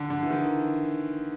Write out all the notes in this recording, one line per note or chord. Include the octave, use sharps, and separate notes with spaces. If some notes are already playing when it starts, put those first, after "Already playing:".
Already playing: D3
D3
E3
D#3